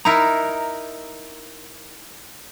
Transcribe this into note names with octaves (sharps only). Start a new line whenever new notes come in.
D#4 E4 A#4 A#5